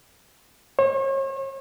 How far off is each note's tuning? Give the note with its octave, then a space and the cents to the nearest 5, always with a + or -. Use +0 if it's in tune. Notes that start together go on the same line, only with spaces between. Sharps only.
C#5 -40